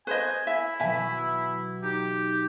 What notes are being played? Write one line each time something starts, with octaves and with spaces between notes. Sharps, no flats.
B4 C5 D#5 G#5
E4 E5
B2 E3 F#3 E5 G#5
D#4 G4 G5